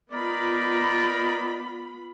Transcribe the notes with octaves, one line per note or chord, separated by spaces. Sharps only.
B3 D#4 F4 A#4 D5 B5